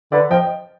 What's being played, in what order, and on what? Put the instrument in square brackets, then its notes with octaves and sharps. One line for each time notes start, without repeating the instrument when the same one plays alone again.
[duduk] D3 [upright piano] B4 D5
[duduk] F3 [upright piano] D#5 G5